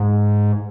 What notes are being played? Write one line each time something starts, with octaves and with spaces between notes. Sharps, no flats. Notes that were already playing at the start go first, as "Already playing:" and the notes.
Already playing: G#2